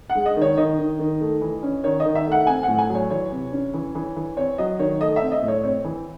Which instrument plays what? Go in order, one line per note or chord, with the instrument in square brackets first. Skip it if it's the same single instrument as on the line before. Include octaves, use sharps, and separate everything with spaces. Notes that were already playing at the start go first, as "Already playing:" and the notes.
[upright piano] F#5
G#3
D#5
D#3
C#5
D#3 D#5
D#3
D#3
A3
E3
C#4
D#3 C#5
D#5
D#3
E5
A3
F#5
C4 G#5
F#5
A2
G#5
F#3
C#5
E3 C#5
C3
C#4
E3
E3
E3
C4 C#5
F#3 D#5
D#3 C#5
A3 D#5
E5
C4
D#5
A2
C#5
C4 C#5
E3